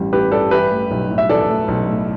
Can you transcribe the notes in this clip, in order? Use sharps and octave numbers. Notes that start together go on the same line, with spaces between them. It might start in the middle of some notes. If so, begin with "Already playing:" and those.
Already playing: A1 G2 G3
A1 G4 B4
G2 A4 D5
E3 G4 B4
A3
B1
A2
E5
E3 A4 D5
A3
B1
A2